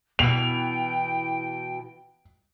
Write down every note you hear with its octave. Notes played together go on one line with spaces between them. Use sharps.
B2 E3 G5 F7